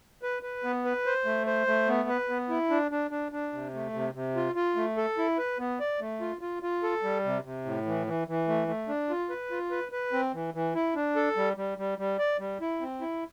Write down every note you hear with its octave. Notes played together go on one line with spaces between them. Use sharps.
B4
B4
B3
B4
C5
A3
C5
A3
B3
B4
B3
E4
D4
D4
D4
D4
C3
A3
C3
C3
F4
F4
A3
A4
E4
B4
B3
D5
A3
F4
F4
F4
A4
G3
C3
C3
A2
E3
E3
E3
A3
A3
D4
F4
B4
F4
B4
B4
C4
E3
E3
E4
D4
A4
G3
G3
G3
G3
D5
G3
E4
C4
E4